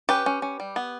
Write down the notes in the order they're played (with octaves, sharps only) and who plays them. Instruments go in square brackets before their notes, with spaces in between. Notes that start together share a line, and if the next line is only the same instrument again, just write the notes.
[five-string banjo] C#4 G4 B4
C#4
C#4
G3
B3